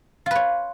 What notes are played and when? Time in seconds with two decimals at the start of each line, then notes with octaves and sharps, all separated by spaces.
0.26 F4
0.31 B4
0.35 C#5